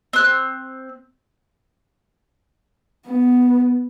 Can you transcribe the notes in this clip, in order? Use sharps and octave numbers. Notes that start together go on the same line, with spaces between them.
C4 F#6
B3